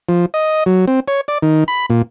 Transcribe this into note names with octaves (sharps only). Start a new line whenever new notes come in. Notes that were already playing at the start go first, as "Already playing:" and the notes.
F3
D#5
F#3
C4
C#5
D5
D#3
B5
A#2